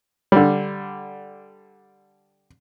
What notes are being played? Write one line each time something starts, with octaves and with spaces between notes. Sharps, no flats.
D3 G3